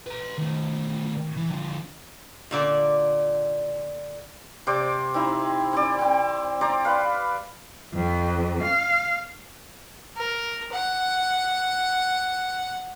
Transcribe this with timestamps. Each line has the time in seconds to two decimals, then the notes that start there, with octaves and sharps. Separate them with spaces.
0.06 B4 A#5
0.38 D#3 A3
1.37 E3
1.50 D3 F3
2.51 A#2 D3 D5
4.67 C3 C5 D5 D6
5.14 C4 D#4 E4
5.73 C4 D5
5.99 C4 G5
6.61 C5 D5 A#5
6.85 B4 F5
7.95 F2
8.64 F5
10.17 A#4
10.72 F#5